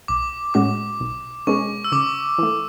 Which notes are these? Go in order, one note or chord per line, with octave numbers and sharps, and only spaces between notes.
B1 D6
A2 G#3 C#4 F#4 D6
B1
B2 G#3 C#4 G#4 C#6
E6
C#3 D6
E3 A3